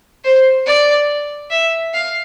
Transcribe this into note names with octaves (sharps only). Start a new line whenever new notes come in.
C5
D5
E5
F5